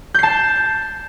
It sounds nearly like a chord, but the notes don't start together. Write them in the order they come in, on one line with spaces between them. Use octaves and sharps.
G6 C7 A5